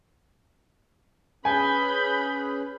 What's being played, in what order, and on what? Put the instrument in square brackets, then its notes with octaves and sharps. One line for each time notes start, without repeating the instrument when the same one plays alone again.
[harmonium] C#4 G#4 B4 [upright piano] G#5 [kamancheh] B5 [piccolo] G6